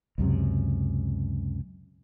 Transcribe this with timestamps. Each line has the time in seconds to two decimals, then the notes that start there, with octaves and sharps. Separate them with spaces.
0.18 C#2 F#2 C3